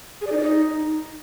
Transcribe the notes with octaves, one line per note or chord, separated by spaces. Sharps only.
G#4
D5
D#4
D5
D#4